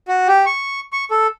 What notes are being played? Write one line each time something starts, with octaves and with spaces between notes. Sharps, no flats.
F#4
G4
C#6
C#6
A4